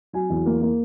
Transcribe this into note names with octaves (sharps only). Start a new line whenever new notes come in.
F#3 G#5
E2
A#3
A#3